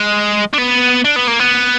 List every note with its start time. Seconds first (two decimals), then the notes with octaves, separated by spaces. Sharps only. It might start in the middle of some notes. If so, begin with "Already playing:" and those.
Already playing: G#3
0.53 D4
0.58 B3
1.05 D4
1.16 B3
1.28 A#3
1.40 B3